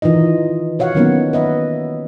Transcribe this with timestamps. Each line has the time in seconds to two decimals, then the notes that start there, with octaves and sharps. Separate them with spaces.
0.02 D#3 E3 D#4 F4 D#5
0.79 F#4 C#5 F5 F#5
0.95 D#3 F#3 A#3 B3 C#4 D#4
1.33 B4 D#5 E5